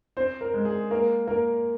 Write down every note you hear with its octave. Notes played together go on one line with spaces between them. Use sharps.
C4 C5
A#4
G#3
G#4
A#3 A#4
A#3 A#4